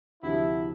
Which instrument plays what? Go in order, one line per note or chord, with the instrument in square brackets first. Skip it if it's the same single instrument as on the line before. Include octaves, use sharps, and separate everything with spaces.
[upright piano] D2 C3 F3 [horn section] E4